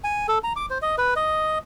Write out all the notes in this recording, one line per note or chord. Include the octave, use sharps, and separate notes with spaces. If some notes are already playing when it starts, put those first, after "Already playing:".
G#5
A4
A#5
D6
C5
D#5
B4
D#5